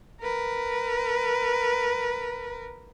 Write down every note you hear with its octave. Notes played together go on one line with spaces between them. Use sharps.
A#4 B4